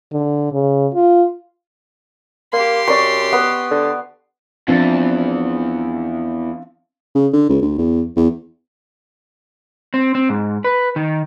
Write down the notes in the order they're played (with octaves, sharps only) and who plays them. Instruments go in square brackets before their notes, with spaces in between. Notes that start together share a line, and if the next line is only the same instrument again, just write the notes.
[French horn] D3
C#3
F4
[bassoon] A#3 [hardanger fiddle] G4 C6
[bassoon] F#2 [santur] D5 C#6
[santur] B3
[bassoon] D3
[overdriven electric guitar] E2 [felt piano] F3 C4 D4
[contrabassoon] C#3
D3
C#2
D2
E2
E2
[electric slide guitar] C4
C4
G#2
B4
D#3